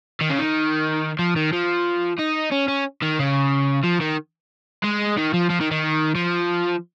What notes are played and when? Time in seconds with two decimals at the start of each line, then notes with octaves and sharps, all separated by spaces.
0.21 D#3
0.30 C#3
0.39 D#3
1.19 F3
1.36 D#3
1.53 F3
2.19 D#4
2.52 C#4
2.68 C#4
3.02 D#3
3.19 C#3
3.84 F3
4.01 D#3
4.84 G#3
5.17 D#3
5.33 F3
5.50 F3
5.60 D#3
5.71 D#3
6.15 F3